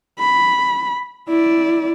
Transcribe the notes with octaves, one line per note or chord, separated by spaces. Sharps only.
B5
E4 D5